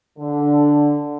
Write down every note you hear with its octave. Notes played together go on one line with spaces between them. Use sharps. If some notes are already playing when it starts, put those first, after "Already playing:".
D3